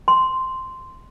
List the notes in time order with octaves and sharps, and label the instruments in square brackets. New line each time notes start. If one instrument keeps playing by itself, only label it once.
[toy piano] C6